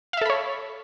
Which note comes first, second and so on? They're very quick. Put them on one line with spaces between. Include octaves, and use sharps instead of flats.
F5 E5 A4 B5 C#5